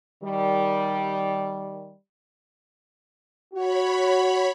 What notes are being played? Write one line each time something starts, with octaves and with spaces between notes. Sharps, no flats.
D#3 G3
F#4 C#5 B5